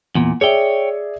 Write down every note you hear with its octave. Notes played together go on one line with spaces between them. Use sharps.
E2 A#2
G#4 C#5 D5 E5 G5